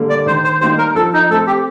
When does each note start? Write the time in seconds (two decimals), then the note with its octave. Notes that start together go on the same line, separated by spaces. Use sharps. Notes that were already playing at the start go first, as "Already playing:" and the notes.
Already playing: D3 G3 A#3
0.10 D5
0.26 D#3 C5
0.44 C5
0.61 G3 A#3 D#4 G4 C5
0.78 A#4
0.95 F3 A4
1.13 D#4
1.29 A3 C4 A4
1.47 G4